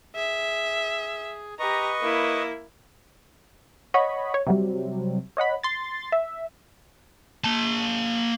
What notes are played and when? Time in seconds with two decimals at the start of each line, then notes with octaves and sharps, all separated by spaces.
0.16 G#4 E5
1.59 G4 B4 D#5 A#5 C#6
2.02 A#3 E4
3.94 C#5 D#5 F#5 B5 C#6
4.34 C#5
4.47 C3 F#3 G3
5.37 C#5 D#5 F#5 B5
5.63 C6 A6
6.12 E5
7.44 A#3 A5